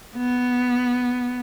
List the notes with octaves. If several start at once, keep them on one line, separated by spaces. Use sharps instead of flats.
B3